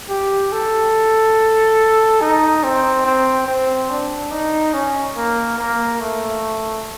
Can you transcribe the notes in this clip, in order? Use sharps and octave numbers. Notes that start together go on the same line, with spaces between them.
G4
A4
D#4
C4
C4
C4
D4
D#4
C#4
A#3
A#3
A3